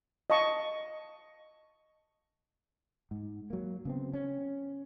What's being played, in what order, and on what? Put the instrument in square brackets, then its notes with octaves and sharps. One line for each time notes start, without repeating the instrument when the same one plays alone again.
[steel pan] D#5 F5 A5 C#6
[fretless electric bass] G#2
F#3 A#3
C#3 B3 C4
C#4